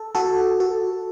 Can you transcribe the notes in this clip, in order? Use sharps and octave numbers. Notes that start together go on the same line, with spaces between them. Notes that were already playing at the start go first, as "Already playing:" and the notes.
Already playing: A4
F#4 A4
F#4 A4